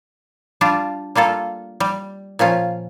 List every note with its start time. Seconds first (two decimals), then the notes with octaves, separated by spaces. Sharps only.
0.61 G3 D4 F4
1.15 G3 A#3 F4 A4
1.80 G3
2.39 A#2 F3 C#4 F4